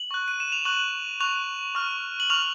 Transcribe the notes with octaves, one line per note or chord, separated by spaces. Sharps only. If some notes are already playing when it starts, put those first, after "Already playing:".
Already playing: F#7
C#6 F#6
D#7
E7
F7
C#6 F#6 F#7
C#6 F#6 F7
C#6 F6
F#7
C#6 F6 F7